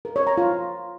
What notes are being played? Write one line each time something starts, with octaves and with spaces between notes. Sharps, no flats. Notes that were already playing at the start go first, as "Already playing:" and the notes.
A#4
C#5
A#5
F4